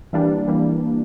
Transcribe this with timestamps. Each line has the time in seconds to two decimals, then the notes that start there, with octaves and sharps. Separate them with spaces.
0.13 E3 G3 A#3 D4
0.48 E3 G3 A#3